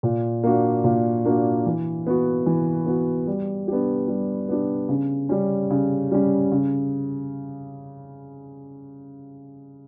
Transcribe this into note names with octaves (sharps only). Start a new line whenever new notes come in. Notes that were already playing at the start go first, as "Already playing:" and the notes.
A#2
A#3 D4 F#4
A#2
A#3 D4 F#4
E3
B3 F#4
E3
B3 F#4
G3
B3 D4 G4
G3
B3 D4 G4
C#3
G3 C#4
C#3
G3 C#4
C#3